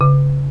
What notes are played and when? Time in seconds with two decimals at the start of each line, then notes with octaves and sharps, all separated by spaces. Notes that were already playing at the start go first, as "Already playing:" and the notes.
0.01 C#3